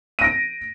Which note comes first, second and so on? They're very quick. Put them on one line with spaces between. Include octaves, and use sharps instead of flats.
D#7 A#6 D7